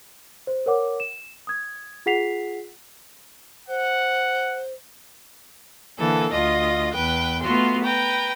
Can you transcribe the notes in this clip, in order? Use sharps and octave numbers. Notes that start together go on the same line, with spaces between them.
C5
A#4 C#5 F#5 D6
E7
D#6 G#6
F4 G#4 F#5 B6 C7 F7
C5 F#5
D3 E3 A#3 A4
D2 F4 D#5 A#6
E2 B4 G5 F#6
A3 B3 F4 F#4 C6
B4 G5 A#5